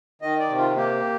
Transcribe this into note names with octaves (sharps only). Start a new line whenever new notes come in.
D#3 D#5
D5
C3
F4
A#3 G4